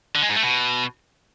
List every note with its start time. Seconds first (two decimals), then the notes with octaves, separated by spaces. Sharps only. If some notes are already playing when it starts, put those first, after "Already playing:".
0.15 D3
0.22 G#3
0.29 G#2
0.36 A3
0.43 B2